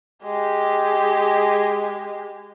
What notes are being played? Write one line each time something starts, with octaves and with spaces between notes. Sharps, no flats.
G#3 G4